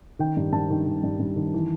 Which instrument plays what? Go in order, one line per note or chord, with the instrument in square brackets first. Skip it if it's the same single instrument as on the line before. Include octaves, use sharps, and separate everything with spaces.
[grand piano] D#3 G5
G2
G2 A5
D#3
D#3
G2
G2
D#3
E3